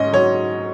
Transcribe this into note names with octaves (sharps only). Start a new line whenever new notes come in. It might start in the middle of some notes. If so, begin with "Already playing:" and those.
Already playing: G#2 C#4 D#5
F#3 C#5